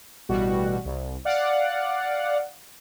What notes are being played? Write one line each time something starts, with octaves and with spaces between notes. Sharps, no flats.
A1 B2 G3 F#4
C2
D5 F5 F#5